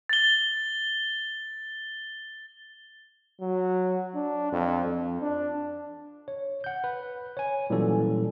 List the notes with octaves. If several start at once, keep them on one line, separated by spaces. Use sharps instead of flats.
A6 G7
F#3
D4
F2
F2
D4
C#5
F#5 G6
B4
C#5 G#5
A#2 E3 F#3 G3 C#4 A4